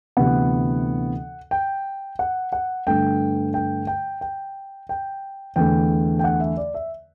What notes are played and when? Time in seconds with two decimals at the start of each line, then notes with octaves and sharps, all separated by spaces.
0.17 D2 C3 E3 B3 F#5
1.51 G5
2.19 F#5
2.53 F#5
2.87 G2 D3 A3 G5
3.54 G5
3.87 G5
4.21 G5
4.89 G5
5.56 E2 D3 A3 G5
6.19 G5
6.24 F#5
6.40 E5
6.57 D5
6.74 E5